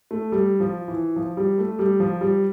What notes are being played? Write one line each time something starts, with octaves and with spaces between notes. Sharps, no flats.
A3
G3
F3
E3
F3
G3
A3
G3
F3
G3